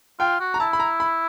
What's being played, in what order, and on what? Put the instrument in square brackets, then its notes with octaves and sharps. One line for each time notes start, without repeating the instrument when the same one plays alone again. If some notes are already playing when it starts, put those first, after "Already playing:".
[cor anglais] F4 [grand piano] G5
[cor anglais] F#4
[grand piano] A#5
[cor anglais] E4 [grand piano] A5
[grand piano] B5
A#5
B5